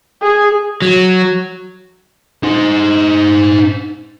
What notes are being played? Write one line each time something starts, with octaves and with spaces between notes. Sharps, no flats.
G#4
F#3
D#4 C5